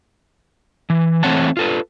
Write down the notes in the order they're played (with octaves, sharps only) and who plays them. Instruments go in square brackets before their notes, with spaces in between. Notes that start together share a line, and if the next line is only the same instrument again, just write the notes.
[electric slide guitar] E3
E3 A3 C4 C#5 F#5 A5
F4 A4 B4